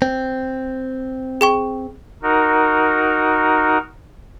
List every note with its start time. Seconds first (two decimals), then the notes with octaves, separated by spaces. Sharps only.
0.02 C4
1.41 G#4 G5 C#6
2.23 D#4 F#4 A#4